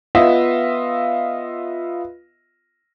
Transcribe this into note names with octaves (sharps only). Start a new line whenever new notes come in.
B3 F4 D#5 E5